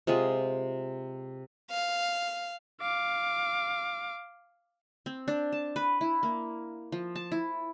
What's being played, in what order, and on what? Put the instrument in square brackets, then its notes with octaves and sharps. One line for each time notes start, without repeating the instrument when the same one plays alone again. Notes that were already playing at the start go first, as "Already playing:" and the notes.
[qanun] C3 G#3 F4 G#4
[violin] F5
[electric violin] F5 D6
[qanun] C4
D4
A5
B4
E4
A#3
F3
A5
E4